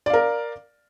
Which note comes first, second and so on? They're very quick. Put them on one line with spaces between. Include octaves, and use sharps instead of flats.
D5 F5 A#4